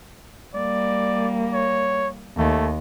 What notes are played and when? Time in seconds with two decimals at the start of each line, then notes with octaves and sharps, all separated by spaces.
0.54 G3 A#3 D5
1.52 C#5
2.37 D#2 A3